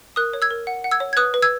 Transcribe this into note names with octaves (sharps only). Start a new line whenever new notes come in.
A#4 D#6 F#6
C#5
E6 G#6
A#4
F#5
F#5
E6 G#6
C#5
G#6
B4 D#6 F#6
B4
E6 G#6